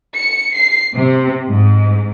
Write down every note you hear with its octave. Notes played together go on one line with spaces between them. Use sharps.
C#7
C7
C3
G#2